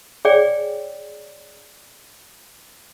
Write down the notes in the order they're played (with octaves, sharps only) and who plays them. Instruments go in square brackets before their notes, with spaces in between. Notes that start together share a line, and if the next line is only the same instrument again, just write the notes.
[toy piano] G#4 C#5 D5 G5 G#5